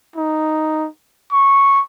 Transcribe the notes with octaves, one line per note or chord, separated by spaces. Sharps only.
D#4
C#6